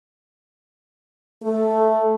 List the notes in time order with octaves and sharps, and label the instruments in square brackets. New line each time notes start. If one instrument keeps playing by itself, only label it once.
[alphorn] A3 [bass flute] A4